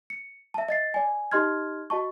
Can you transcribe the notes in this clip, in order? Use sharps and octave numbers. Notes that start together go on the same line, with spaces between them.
C#7
E5 A5
D#5 A6 C7
D5 G#5
D#4 G4 D#5 C6 F6 G#6
F#4 D#5 A5 C#6